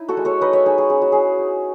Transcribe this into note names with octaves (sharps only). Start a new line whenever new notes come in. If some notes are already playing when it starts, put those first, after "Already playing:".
Already playing: D#4 E4
F#4 A4
G#3
A4 C#5
D#4 B4 D#5
C#5 E5
D#4 G#4
G#4
C#4 G#4
F#4
E4 G#4
D#4